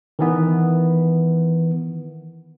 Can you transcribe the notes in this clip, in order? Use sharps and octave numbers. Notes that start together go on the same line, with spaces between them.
D#3 E3 B3